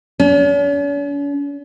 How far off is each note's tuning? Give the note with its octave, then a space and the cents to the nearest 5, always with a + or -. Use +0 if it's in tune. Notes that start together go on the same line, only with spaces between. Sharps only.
C#4 +45